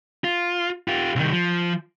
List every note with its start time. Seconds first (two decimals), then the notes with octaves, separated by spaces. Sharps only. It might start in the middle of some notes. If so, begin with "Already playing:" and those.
0.24 F4
0.88 F4 G4
1.16 C2 D#3
1.33 F3